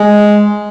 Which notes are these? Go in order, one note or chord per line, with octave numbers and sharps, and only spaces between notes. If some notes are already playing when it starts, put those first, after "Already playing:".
Already playing: G#3